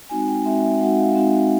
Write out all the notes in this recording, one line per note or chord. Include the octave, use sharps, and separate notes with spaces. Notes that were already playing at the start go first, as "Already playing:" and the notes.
G#3 C4 D#4 F#4 G#5
G5
G#3 C4 D#4 F#4 E5
E5
G#3 C4 D#4 F#4 F#5
F5
G#3 C4 D#4 F#4